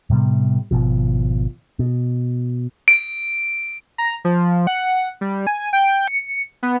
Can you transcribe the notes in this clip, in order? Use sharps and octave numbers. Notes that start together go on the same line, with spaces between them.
A2 C3 G3 B3
G#1 B2 F3
B2
D7
A#5
F3
F#5
G3
G#5
G5
C#7
B3